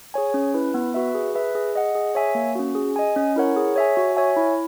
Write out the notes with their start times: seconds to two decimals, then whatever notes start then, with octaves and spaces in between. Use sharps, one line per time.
0.14 G#4 C#5 G#5
0.34 C#4
0.54 E4 B4
0.74 B3
0.94 F#4 B4 E5
1.15 G#4
1.35 B4 E5
1.55 G#4
1.75 D#5 F#5
1.95 G#4
2.15 C#5 E5 G#5
2.35 A#3
2.55 C#4 F#4
2.75 G#4
2.96 D#5 G#5
3.16 C#4
3.36 E4 A#4 C#5 F#5
3.57 G#4
3.76 C#5 E5 G#5
3.97 F#4
4.17 C#5 E5 G#5
4.37 E4